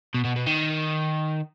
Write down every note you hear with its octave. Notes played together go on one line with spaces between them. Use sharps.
B2
B2
B2
D#3